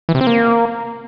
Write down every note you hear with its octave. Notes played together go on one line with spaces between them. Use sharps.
E3
C3
C4
A#3